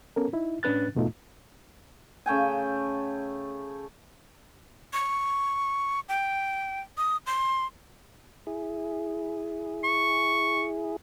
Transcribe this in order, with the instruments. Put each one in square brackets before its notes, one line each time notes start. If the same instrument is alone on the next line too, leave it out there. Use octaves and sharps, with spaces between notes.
[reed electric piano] B3 C#4 A4 A#4
D#4 E4
A2 C#4 D4 B4 F#6 A6
E2 G#2 B2 A3 D#4 F4
[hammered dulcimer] C#3 A3 G5 G#5
[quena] C#6
G5
D#6
C6
[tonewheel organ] E4 G#4
[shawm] C#6